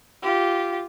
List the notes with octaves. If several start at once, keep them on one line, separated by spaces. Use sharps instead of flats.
F4 G4